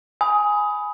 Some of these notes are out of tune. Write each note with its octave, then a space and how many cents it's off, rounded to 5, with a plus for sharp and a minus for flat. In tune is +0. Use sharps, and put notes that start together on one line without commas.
G#5 +0 B5 +5 D#6 +20